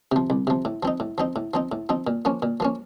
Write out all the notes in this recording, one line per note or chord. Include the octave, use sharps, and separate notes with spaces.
C3 F3
C2
C3 F3
A2
F3 C4 D#4
A2
F3 C4 D#4
A2
F3 C4 D#4
A2
F3 C4 D#4
A#2
F3 A#3 C#4
A#2
F3 A#3 C#4